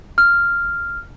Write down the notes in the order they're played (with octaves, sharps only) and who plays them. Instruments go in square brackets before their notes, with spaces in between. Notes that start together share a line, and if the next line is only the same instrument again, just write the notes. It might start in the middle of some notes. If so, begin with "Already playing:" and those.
[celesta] F6